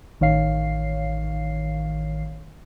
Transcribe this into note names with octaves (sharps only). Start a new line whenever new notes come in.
A1 D#3 C#5 F5 C7